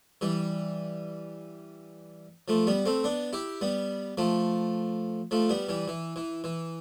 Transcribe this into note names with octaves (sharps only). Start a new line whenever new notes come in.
E3 G3
F3 A3
G3 B3
A3 C4
B3 D4
E4 G4
G3 B3
F3 A3
F3 A3
G3 B3
E3 G3
E3
E3
E3